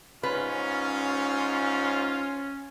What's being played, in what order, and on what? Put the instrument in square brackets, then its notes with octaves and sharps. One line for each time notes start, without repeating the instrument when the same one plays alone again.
[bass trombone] G#2 [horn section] C#4 [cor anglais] F4 [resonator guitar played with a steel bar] B4